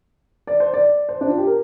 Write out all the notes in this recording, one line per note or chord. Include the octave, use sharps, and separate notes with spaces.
D5
C5
D5
C5
D4
F4
G4
A#4